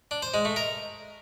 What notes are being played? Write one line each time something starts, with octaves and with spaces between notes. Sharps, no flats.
D4
C5
G#3
A3
A#4